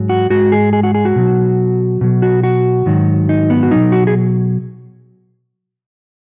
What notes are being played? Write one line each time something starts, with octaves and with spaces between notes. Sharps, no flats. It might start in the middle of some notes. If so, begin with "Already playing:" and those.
Already playing: G#2 F#3
F#4
G#2 G#3 F#4
G#4
G#4
F#4
G#4
F#4
B2 F#3
B2 F#3
F#4
F#4
G#2 D#3 F#3
D#4
B3
F#4
B2 F#3 D#4
F#4
G#4